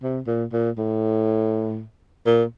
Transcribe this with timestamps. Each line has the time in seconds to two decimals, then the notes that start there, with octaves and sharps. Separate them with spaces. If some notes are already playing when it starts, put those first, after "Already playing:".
0.03 C3
0.27 A#2
0.53 A#2
0.78 A2
2.26 A#2